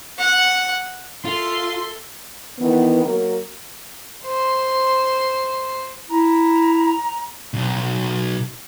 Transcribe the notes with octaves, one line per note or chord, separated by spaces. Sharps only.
F#5
F4 A4 E5 C6
D#3 E3 B3
F#3 A#3 A#4
C5 C6
E4 A#5
B1